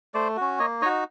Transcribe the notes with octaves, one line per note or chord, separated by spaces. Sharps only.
A3 C5 D5
C#4 F#4
A#3 C#5 D#5
D#4 F#4 C#5 D#5